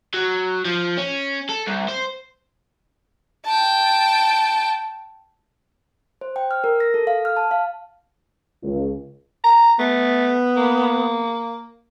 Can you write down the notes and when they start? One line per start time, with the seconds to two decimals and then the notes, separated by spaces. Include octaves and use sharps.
0.14 F#3
0.65 F3
0.98 C#4
1.49 A4
1.67 C2
1.88 C5
3.45 G5 A5
6.21 C5
6.36 G5
6.51 F6
6.64 A#4
6.80 A#6
6.94 A4
7.07 F5
7.25 F6
7.36 A5
7.51 F5
8.63 C#2
9.44 A#5
9.79 A3 B3
10.56 A#3